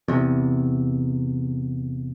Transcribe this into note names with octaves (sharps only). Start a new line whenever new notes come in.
E2 C3